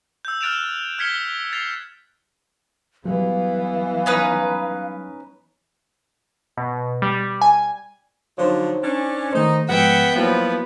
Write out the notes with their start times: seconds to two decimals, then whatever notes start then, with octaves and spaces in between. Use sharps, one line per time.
0.25 E6 G6
0.41 F6 F#6 A6 D7 E7 F7
0.99 F6 G#6 B6 C#7 G7
1.53 A6 C7 F7
3.05 E3 F#3 G3 B3 F5
4.06 C#4 D#4 B4
6.57 B2
7.02 G3
7.42 G#5
8.38 D3 F3 F#3 D#4 C5 C#5
8.83 C#4 D4
9.33 D#3 A3 D#4 C5
9.69 G#2 F3 G#3 B3 E5 F#5 G5
10.16 F3 F#3 A#3 B3 E4 F#4